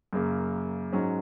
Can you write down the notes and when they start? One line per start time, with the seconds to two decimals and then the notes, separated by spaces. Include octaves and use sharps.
0.13 F#2 C#3 A#3
0.92 G#2 F#3 C#4